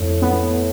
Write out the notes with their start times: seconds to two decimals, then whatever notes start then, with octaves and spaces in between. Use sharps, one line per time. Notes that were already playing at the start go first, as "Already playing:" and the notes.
Already playing: F2 A2
0.22 B3